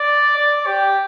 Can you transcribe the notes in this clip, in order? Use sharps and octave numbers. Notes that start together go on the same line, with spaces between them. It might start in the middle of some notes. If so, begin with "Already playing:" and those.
Already playing: D5
D5
G4